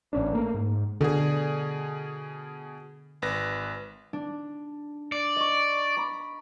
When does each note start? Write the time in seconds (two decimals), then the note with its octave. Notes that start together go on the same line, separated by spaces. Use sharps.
0.13 A1 C#4 D4
0.33 A3 A#3
0.54 G#2
1.01 B2 D3 G#4
3.22 G#1 B4 A#6
4.13 D4
5.12 D5
5.36 D#5 C#6
5.97 A#5 B5